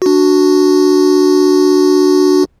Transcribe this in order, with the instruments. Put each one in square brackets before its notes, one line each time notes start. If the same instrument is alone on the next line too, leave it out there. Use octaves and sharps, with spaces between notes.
[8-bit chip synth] D4 F#4